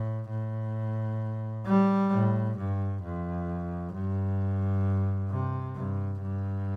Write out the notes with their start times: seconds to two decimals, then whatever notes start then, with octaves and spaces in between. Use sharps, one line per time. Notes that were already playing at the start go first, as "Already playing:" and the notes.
Already playing: A2
0.30 A2
1.66 G3
2.13 A2
2.57 G2
3.03 F2
3.93 G2
5.31 C3
5.76 G2
6.21 G2